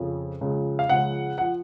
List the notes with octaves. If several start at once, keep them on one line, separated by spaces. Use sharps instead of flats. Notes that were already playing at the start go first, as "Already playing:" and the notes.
Already playing: F2 C#3 F3
C#2 C#3 F3
F5
C#2 C#3 F3 F#5
F3 F#5